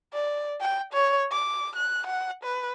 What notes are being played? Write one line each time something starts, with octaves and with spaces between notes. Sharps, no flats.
D5
G5
C#5
D6
F#6
F#5
B4